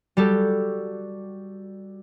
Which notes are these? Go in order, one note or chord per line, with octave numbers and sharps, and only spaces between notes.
G3 F#4 G4 A4